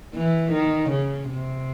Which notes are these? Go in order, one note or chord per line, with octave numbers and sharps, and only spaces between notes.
E3
D#3
C#3
C3